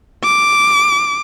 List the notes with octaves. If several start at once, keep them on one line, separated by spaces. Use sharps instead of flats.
D6